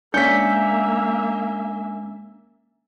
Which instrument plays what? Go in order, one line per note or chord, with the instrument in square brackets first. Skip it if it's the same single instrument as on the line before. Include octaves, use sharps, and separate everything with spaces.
[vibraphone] G#3 [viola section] A#3 E5 [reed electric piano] C#4 D4 [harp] G6 B6